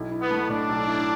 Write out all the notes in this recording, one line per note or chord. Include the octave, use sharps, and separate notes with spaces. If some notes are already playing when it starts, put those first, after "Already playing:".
Already playing: B1 E4
E4
B3
A3
A2 D4
B1
E4